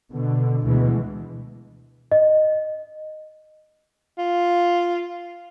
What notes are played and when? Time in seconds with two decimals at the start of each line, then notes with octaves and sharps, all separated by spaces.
0.11 B2 D3
0.64 D2 B2 E3 G#3
2.12 D#5
4.18 F4